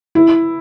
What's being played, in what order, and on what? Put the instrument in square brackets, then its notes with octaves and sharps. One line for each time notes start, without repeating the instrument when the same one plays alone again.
[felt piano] E4